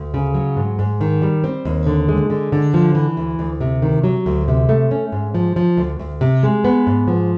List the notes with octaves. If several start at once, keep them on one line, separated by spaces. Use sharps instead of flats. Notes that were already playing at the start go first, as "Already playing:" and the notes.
Already playing: D2
C#3
F#3
G#2
G#2
D#3
G3
C4
D#2
D3
G#3
D3
D3
F3
E3
D2
D2
C3
D#3
F#3
D2
C3
A3
C#4
G#2
F3
F3
D2
D2
C3
G#3
B3
G#2
F3